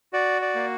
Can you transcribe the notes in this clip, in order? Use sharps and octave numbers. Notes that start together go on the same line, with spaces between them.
F#4 D5
D5
A#3